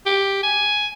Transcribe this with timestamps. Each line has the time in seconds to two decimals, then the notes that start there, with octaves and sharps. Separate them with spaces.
0.06 G4
0.43 G#5